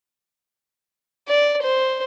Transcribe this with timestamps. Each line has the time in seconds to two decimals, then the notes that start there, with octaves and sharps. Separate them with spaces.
1.28 D5
1.63 C5